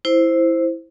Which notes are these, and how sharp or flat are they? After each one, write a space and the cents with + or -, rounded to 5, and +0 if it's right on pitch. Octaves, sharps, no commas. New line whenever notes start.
E4 +0 C5 +0